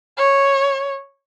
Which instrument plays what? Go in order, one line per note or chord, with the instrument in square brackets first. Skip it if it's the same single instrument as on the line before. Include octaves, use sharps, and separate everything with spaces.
[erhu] C#5